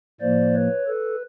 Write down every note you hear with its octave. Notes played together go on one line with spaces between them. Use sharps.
A2 F3 A#3 C5 D5
B4 C#5
A4 B4